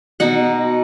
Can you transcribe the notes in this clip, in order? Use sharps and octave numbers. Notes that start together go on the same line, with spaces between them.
B2 D#4 F#5